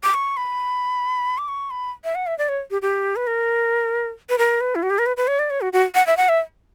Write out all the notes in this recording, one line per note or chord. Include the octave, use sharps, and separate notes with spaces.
D6
C#6
B5
D6
C#6
B5
E5
F#5
E5
D5
C#5
G4
G4
B4
A#4
B4
A#4
B4
E4
F#4
G4
A#4
B4
B4
C#5
D5
C#5
F#4
F#4
F#5
E5
F#5
E5